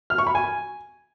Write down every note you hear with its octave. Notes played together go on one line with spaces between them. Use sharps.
F6
C#6
B5
G#5